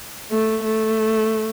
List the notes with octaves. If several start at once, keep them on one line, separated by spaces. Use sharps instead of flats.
A3
A3